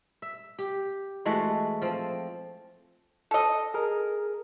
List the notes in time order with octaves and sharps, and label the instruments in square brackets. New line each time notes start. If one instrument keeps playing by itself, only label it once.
[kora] E5
G4
E3 G#3 A3 F#4
F3 C4
[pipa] A4 D#5
[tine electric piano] G#4 A#4